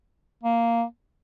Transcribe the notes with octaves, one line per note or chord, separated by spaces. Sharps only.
A#3